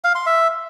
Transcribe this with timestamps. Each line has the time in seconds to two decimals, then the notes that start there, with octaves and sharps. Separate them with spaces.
0.04 F5
0.15 C6
0.26 E5